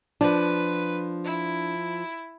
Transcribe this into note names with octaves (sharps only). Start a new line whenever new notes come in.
F3 D4 B4
E4